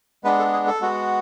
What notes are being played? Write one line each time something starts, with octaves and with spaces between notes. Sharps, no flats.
G#3 B3 D4 B4
A4
G#4
A4
G#3 B3 F#4